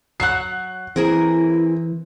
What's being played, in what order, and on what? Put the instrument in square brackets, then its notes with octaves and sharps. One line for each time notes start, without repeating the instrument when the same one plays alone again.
[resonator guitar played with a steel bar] F#3 C#5 F#5 [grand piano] F#6 C7
[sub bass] E3 [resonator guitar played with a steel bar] A#3 G#4 A#4 [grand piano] C4 [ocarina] E4